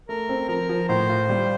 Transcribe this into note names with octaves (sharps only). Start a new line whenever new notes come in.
A3 A#4
C4
F3 A#4
F3
A2 C5
F4
G3